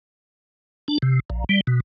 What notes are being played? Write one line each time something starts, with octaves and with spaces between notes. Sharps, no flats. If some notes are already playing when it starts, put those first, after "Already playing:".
D4
C3
A#1
G3
B2